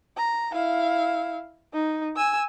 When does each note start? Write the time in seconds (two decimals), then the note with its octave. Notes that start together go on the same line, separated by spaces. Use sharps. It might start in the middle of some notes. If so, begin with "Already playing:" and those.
0.16 A#5
0.52 E4 F5
1.73 D#4
2.16 G#5 E6